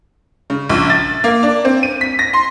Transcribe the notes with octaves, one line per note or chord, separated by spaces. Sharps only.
C#3
A#1
A6
A#3
D4
C4
D#7
B6
A#6
C6